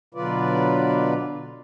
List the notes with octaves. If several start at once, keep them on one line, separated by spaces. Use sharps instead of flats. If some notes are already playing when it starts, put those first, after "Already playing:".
B2 D3 F#3 F4 B4 D5